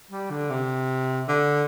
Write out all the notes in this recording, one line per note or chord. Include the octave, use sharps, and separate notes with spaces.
G3
D3
C3
D3